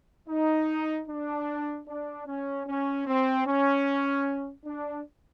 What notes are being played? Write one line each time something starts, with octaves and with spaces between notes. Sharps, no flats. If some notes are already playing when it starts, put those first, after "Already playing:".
D#4
D4
D4
C#4
C#4
C4
C#4
D4